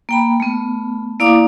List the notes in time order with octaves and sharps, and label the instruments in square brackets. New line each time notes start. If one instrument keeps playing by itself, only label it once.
[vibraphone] A#3 G5 B5
A3 B3
A#3 E4 D5 F5 D6 D#6